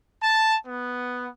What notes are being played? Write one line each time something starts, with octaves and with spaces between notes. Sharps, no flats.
A5
B3